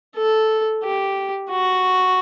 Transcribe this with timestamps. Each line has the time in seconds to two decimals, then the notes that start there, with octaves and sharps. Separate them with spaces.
0.16 A4
0.83 G4
1.51 F#4